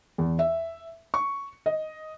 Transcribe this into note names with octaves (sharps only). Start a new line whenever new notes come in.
E2
E5
C#6
D#5